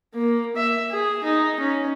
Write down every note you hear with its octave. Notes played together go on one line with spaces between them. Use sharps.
A#3
E5
G#4
D#4
C#4